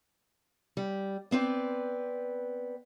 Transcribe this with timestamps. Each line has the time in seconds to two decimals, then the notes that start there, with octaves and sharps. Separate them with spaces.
0.77 G3
1.31 B3 C4 B4 D5